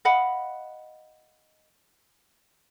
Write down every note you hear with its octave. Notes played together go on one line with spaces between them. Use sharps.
D#5 F5 F#5 B5